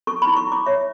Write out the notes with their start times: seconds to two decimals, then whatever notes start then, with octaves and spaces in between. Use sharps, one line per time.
0.07 A4 C#6
0.22 B5
0.27 E4
0.36 C#6
0.47 E4 D6
0.66 C#5 E5